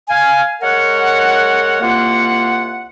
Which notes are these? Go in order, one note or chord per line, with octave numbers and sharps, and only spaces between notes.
F5 G#5
G#3 A#4 C#5 F#5
C2 A#3 F4 F#5